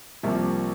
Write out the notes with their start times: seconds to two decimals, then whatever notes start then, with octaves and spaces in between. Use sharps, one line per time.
0.23 C2 C3 F3 A#3